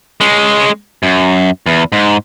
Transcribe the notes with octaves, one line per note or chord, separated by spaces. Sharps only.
G#3 C#4
F#2
E2
G#2